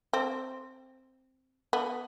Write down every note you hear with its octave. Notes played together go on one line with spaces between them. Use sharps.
C4
B3